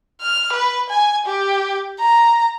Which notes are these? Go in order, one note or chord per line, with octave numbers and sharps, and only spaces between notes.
F6
B4
G#5
G4
A#5